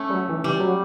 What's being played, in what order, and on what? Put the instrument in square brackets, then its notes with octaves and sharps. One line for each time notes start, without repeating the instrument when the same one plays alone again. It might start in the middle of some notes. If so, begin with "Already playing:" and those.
Already playing: [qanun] A3 C#4
[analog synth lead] G3
F#3
E3
[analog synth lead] E3 [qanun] G3
[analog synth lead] F#3